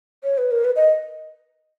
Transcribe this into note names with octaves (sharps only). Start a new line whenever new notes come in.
C#5
B4
A#4
B4
D#5